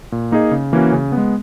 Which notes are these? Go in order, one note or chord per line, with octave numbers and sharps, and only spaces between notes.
A#2
A#3 D#4 G#4 D#5
C#3
E3 A#3 C#4 F#4
C#3
B3
G#3